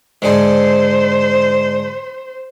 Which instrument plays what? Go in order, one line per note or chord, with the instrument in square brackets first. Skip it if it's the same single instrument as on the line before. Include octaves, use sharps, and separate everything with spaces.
[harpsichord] G#2 D3 G#4 [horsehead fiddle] C5